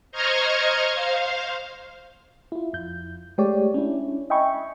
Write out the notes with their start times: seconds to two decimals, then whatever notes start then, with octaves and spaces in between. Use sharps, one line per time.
0.12 C5 D#5 A#5 C#6 F6 G#6
0.89 C5 F5
2.52 E4 F4
2.73 F2 G6
3.38 G#3 A3 G4 C#5 D5
3.74 C#4 D4 E4
4.30 D#5 E5 G5 G#5 B5 C#6